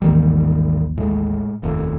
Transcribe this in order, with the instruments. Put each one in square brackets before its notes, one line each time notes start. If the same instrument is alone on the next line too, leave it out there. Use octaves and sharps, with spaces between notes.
[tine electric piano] A1 D#2 [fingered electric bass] G#2 D#3 G3
[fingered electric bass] A2 G#3
F1 D#2 A2